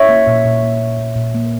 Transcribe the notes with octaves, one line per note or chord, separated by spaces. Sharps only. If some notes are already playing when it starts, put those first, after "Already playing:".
Already playing: C#5 E5
A#3
A#2
A#2
A#3
A#3
A#2
A#2
A#3